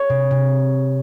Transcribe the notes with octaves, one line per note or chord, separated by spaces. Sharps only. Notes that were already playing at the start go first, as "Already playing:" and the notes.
Already playing: C#5
C3
C3